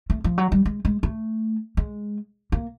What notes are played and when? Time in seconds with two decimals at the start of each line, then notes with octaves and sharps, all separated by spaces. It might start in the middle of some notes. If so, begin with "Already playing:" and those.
0.10 A3
0.24 F3
0.38 F#3
0.52 G3
0.65 G#3
0.85 G#3
1.03 A3
1.77 G#3
2.52 A#3